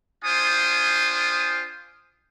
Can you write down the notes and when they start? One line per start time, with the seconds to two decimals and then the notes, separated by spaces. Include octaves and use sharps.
0.24 D4 F4 C5 G5 G#5 D#6